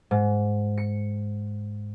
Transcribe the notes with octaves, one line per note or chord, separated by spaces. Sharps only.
G#2
C#7